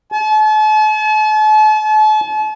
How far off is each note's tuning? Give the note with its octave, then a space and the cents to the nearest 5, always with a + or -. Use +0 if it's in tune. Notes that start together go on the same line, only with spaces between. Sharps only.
A5 -40